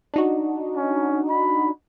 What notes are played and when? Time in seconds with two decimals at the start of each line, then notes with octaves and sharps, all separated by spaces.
0.14 D4 D#4 F#4
0.76 C#4
1.30 B5